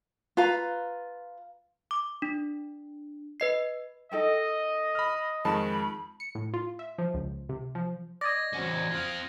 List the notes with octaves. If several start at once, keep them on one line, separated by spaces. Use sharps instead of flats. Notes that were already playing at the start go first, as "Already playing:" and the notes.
F4 B4 F5 A#5
D6
D4
B4 D#5 C7
D#4 A4 D#5 G5
B5 F6
F2 D#3 G#3 A5 B5
C#7
A2
F4
E5
F3
C#2
C3
F3
D5 D#5 G#6 A#6
E2 C4 C#4 F#4 C5
C4 F4 D#6 F6 F#6